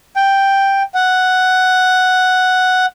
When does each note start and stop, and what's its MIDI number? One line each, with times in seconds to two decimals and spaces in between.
0.16 0.83 79
0.94 2.86 78